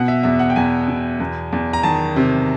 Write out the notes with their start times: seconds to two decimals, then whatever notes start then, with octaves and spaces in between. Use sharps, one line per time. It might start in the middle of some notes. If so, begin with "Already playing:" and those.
Already playing: B2 F#5
0.08 E5
0.23 E2 E5
0.39 F#5
0.50 G5
0.56 E2 G#5
0.88 B2
1.20 E2
1.52 E2
1.73 A#5
1.83 D#3 A5
2.16 C3